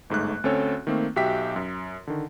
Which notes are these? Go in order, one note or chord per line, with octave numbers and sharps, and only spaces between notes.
G1 G#2 A3 F#6
D2 C4 C#4 A4 C#5
D#3 A3 A#3 C4
B1 F#4 G4 E5 G5 B6
F#2
D3 D#3